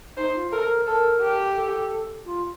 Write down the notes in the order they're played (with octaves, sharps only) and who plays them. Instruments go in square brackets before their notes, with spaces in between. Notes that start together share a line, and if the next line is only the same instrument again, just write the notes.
[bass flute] D#4 [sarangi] C5
[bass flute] F4
[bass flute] A4 [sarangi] A#4
[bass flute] A#4
[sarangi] A4 [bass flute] A#4
[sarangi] G4
[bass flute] A4
F4